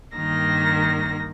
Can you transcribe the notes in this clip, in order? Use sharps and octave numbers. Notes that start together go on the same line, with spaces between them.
G2 D#3 A#3 A#6